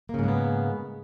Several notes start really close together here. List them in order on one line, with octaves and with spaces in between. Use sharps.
A#3 C#3 G#2 G#3 B3